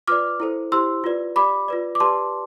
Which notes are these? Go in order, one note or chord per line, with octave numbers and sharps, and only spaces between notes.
F4 B4 D5 D6 F6
E4 A4 C5
E4 G4 C5 C6 E6
F4 B4 D5
G4 D5 B5 D6
F4 B4 D5
D6
G4 B4 D5 A5 C6